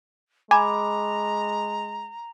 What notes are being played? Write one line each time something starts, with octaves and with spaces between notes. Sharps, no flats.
G#3 G#5 A#5 B5 D6